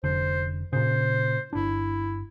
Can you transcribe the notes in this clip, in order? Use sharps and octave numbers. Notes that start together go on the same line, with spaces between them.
F1 D3 C5
A#2 C#3 C5
G1 D4 E4